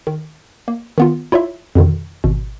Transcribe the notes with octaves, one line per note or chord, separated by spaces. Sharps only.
D#3
A#3
D#3 B3 F4
E4 F4 C#5 D5 E5
F2 B2 D3 D#3
G#1 B2